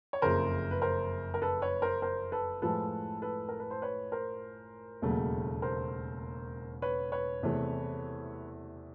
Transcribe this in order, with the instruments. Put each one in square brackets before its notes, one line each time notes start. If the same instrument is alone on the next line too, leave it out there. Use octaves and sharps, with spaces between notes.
[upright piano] C#5
[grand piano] F#1 F2 C#3 [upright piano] A#4 C5
[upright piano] B4
A#4 C5
A#4
A4 B4
B4 C#5
A#4 C5
A#4 C5
A4 B4
[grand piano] A2 F3 G#3 [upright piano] A4 B4
[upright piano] A4 B4
A#4
B4
C5
B4 C#5
A#4 C5
[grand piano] E1 D#2 C#3 F#3 A3
[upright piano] A#4 C5
B4 C#5
B4 C#5
[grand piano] E2 C3 E3 A3